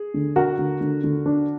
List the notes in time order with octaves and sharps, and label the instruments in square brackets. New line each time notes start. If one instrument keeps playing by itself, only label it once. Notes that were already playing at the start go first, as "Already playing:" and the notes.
Already playing: [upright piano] G#4
[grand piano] D3
[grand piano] D4 [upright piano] F#4 A#4
[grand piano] D3
D3
D3
D4